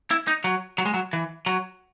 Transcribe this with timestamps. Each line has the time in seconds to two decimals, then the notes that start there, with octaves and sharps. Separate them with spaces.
0.11 E4
0.27 D#4
0.44 F#3
0.78 F#3
0.85 G#3
0.94 F#3
1.13 E3
1.46 F#3